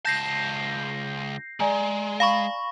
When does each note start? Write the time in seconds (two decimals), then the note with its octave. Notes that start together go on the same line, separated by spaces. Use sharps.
0.05 C#2 A5 G6 A#6 C7
1.60 G#3 D5 G#5 A#5
2.20 F5 B5 C#6